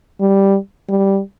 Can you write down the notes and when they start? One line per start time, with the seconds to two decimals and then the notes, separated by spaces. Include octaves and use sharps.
0.20 G3
0.89 G3